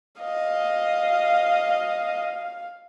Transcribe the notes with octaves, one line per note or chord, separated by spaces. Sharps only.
D#5 F5